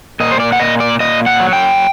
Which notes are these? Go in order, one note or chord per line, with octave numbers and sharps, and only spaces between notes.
A#2 D#5
C5
D5
F#5
A#2 D#5
D5
A#2 D#5
F#5
F#3
G5